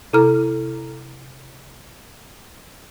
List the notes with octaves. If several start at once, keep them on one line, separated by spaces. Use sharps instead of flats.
C3 E4 A4 A#5 F6